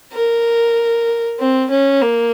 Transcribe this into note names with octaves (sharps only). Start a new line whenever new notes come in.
A#4
C4
C#4
A#3